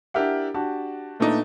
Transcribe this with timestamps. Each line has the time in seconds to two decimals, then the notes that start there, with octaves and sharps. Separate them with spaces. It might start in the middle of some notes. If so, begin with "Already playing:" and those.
0.14 D4 E4 G4 A#4 E5 F#5
0.54 D4 F#4 G4 A5
1.20 A#2 A3 B3 D4 D#4